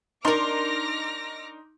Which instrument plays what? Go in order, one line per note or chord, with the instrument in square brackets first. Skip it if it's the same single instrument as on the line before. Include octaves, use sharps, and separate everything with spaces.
[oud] D4 A#4 [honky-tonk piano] D#4 C6 [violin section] D6 F6 A#6